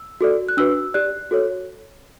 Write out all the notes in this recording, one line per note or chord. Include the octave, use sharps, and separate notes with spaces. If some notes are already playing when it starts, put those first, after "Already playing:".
Already playing: E6
F#4 A4 D5
F#6
D4 F#4 B4 E6
G4 D5 F#6
F#4 A4 C#5